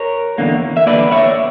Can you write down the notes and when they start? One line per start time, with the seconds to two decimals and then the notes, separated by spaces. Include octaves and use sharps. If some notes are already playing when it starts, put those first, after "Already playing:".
Already playing: A#4 C#5
0.38 E2 D3 A#3
0.77 E5
0.87 E2 D3 A#3 B4 D5
1.11 C#5 E5